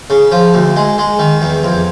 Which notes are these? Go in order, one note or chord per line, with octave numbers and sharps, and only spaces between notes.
C#3
F3
D2
G#3
G#3
D#3
E2
F2